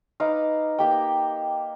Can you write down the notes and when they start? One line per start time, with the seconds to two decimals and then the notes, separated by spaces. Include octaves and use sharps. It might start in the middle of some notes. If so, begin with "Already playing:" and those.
0.20 D#4 B4 F5 D6
0.79 A#3 G4 G5